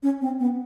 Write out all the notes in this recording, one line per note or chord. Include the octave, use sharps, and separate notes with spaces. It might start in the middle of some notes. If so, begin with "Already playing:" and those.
C#4
C4
B3